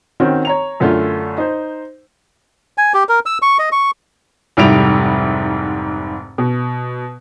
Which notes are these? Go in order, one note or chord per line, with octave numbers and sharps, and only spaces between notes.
D#3 C4 C#4 F#4 C#5
C#5 A#5 F7
F#2 D3 A3 F4
D#4 C5
G#5
G4
A#4
E6
C#6
D#5
C#6
F1 G#2 G3 E4 D7 F7
B2